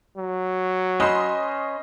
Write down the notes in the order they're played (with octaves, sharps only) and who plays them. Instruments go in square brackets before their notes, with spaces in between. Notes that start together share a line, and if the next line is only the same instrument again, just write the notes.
[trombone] F#3
[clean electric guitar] C#4 B4 C5 [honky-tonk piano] D#5 C6